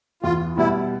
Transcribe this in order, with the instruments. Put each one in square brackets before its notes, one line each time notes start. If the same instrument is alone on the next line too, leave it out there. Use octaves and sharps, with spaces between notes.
[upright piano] E2 [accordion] F4
[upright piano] B2 G3 [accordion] E4